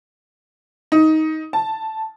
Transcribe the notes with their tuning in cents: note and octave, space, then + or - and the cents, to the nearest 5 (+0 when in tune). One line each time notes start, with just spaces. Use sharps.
D#4 +15
A5 +0